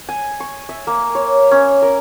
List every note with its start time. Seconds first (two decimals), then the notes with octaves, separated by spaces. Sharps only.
0.09 G#5
0.40 C#6
0.69 E5
0.87 A#3
1.15 C#5
1.51 C#4
1.82 A#4